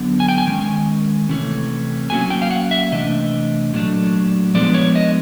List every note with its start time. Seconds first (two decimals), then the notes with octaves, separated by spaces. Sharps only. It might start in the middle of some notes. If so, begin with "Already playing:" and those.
Already playing: D3 F#3 B3
0.20 G#5
0.29 G5
0.38 G#5
0.47 D#3 G#3 C#4
1.29 C3 E3 A3 C#4
2.10 A2 F#3 A#3 C#4 G#5
2.30 G5
2.42 F5
2.51 F#5
2.71 E5
2.92 C3 E3 A3 D4 D#5
3.74 A#2 F#3 A3 D4
4.55 F3 G#3 B3 D4 D5
4.74 C#5
4.96 D#5